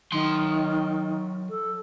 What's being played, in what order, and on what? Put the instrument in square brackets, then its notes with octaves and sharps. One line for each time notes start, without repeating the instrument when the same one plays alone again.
[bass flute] D#3 [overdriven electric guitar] F#3 C6
[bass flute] A4